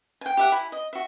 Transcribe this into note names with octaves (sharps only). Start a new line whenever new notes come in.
G5 G#5
G4 E5 F#5
E4 G#5
D#5
F#4 E5